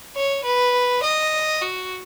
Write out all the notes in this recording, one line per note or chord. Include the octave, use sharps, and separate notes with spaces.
C#5
B4
D#5
F#4